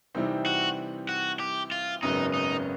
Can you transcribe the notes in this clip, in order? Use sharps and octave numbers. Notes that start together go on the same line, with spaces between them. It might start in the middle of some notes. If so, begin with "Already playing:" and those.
C3 E3 G3 C4 D#4
F#4
F#4
G4
F4
G#1 F#2 C#3 F#3 B3 D#4
D#4